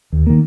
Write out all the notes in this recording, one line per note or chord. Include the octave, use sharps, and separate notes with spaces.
D#2
D#3 A#3